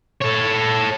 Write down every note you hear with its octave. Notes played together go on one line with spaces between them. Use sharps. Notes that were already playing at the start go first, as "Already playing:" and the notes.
A4 C#5